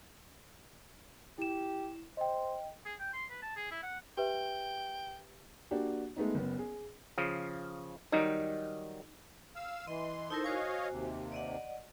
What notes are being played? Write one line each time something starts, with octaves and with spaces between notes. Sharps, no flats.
E4 G4 E7
C5 D#5 G5
G#4
G5
C6
B4
A5
G#4
E4
F#5
G4 B4 E5 G5
A#3 D4 F#4 G4
G#3 A3 B3 D#4
F#1 B3
G#4
C#3 F3
D#3 F#3 G3 D#4
F5 E6
E3 D#5 C6
D#4 E4 A4 A#4 C5
F#4 C5 C#5 D#5 F5 G#5
D#2 C3
D5 D#5 F#5